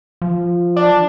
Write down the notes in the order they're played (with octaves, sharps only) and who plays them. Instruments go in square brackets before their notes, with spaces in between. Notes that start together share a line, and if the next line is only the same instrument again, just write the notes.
[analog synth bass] F3
[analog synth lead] D4